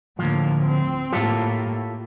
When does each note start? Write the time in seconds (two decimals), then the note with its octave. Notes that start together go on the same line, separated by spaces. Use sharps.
0.19 D2 A2 F3 A#3
0.66 C4
1.13 A2 A#3 F4 G4 A4